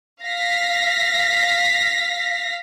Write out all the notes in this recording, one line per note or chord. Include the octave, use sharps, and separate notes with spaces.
F5 A#6 B6